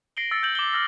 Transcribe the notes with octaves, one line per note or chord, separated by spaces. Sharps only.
A#6 C7 D7 F#7 G7
E6 A6 C#7
G6 F#7
D6 G7
D6 E6 F6 A#6